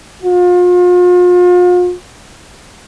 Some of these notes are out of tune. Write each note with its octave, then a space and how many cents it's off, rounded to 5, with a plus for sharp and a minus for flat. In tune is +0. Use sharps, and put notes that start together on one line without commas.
F4 +40